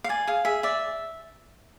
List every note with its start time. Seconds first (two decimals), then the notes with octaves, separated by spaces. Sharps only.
0.04 F5
0.09 D5 G#5
0.27 G#4 F5
0.45 G#4 E5
0.63 D5 E5